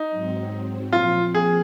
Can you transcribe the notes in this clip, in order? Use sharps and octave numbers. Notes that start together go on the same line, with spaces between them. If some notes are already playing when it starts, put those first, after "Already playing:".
Already playing: D#4
G#2 F#3 C4
A#2 F3 C4 F4
G#4